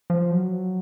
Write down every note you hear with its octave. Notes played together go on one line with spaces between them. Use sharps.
F3
F#3